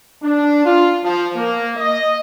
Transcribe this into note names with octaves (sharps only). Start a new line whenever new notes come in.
D4
F4
F3
A#3
D#5